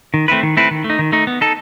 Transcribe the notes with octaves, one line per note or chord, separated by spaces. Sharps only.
D#3
A3 C4 E4 B4
D#3
A3 C4 E4 B4
D#3
A3
D#4
D#3
A3 D#4
B3
D#4 A4